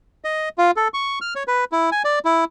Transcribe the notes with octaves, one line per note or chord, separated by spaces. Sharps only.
D#5
F4
A4
C#6
F6
C#5
B4
E4
G#5
D5
E4